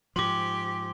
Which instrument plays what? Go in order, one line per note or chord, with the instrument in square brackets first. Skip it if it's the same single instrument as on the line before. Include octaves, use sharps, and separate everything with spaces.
[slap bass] G#2 F3 [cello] G4 [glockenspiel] C6 D6